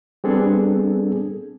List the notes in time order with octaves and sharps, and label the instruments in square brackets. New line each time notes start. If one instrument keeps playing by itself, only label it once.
[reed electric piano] G3 B3 C4 D4 G#4 A4